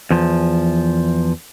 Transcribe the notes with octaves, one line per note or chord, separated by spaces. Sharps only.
E2 F3